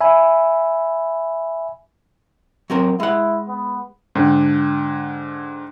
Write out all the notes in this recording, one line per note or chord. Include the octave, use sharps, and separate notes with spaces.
E5 G#5 B5
F#3 C4 A#4
G#3 E4 F#5
B3
G#2 D3 D4 G5